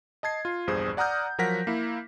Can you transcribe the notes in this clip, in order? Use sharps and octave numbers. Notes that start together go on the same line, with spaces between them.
D#5 A5 G#6 C7
F4
A#1 E2 G2 G#4 C5 D#6
D5 F#5 A#5 D#6 F6 G6
F3 F#3 A#4 F#5 A#6 B6
A#3 E4